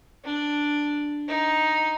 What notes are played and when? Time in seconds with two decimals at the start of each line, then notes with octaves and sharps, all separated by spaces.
0.25 D4
1.28 D#4